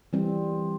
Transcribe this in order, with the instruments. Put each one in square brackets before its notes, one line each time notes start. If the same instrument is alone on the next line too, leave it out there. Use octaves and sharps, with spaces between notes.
[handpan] E3 G3 C4